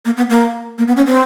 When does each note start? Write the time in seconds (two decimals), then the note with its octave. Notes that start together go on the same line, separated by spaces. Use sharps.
0.05 A#3
0.17 B3
0.30 A#3
0.78 A#3
0.87 B3
0.97 C#4
1.07 C4